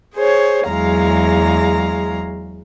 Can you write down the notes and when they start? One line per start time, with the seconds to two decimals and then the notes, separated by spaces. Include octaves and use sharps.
0.14 G#4 C5 C#5
0.66 E2 F#3 G#3 F5 A#5